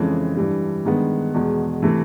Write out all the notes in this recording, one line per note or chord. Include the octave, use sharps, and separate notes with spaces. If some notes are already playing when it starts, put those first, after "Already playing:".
Already playing: F2 C#3 E3 G#3 C4
G2 E3 G3
G2 D#3 G#3 B3
E2 B2 G#3
C3 E3 A3